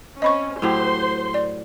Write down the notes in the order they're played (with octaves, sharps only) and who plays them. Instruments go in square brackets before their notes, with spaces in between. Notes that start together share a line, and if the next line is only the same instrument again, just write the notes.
[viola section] C4 C#4 [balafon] D#5 B5 C#6
[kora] A2 F#3 G4 [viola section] C5 C6
[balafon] D5